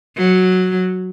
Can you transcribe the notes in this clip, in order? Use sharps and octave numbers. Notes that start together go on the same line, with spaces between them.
F#3